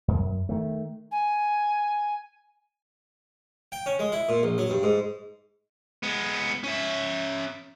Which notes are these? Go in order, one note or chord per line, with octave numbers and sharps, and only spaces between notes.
F#2
D#3 A3
G#5
G5
C#4
G#3
E4
A#2
A#1
F#3
G2
G#2
G#3 B3
C#4 E5